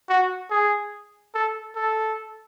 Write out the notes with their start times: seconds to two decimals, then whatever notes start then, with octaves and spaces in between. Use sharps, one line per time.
0.09 F#4
0.51 G#4
1.35 A4
1.76 A4